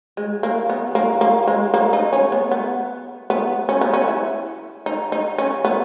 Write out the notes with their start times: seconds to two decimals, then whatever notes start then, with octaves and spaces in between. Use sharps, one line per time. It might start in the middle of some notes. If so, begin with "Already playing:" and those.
0.17 G#3
0.43 A#3
0.69 B3
0.95 A#3
1.21 A#3
1.47 G#3
1.74 A#3
1.93 D#4
2.13 C#4
2.32 B3
2.51 B3
3.30 B3
3.69 C#4
3.81 B3
3.93 C#4
4.08 E4
4.86 D#4
5.12 D#4
5.38 C#4
5.65 B3